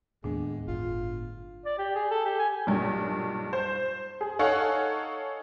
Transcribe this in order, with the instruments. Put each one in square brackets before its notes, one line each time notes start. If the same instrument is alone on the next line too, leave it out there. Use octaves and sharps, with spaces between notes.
[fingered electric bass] D#2 [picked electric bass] A2 B3 [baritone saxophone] G#3 [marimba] D4
[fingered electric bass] G1 [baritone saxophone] F4
[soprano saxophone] D5
G4
G#4
A4
G4
G#5
[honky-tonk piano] B1 G2 A#2
C5
G#4
D#4 A4 C#5 F5 F#5 G#5